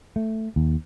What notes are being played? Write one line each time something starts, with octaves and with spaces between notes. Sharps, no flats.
A3
D#2